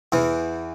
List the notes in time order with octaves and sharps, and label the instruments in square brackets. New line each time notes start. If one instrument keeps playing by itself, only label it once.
[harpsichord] E2 E3